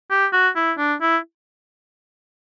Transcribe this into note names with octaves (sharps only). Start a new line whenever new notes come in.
G4
F#4
E4
D4
E4